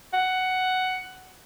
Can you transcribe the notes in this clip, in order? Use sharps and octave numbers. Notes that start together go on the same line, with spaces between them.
F#5